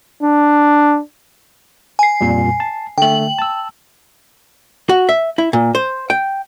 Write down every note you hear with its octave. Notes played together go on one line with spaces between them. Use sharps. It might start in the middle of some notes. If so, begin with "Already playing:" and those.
D4
G#5 C7
F2 A#2 G3
A5
D3 A3 G5 F#7
A5 E6
F#4
E5
E4
A#2
C5
G5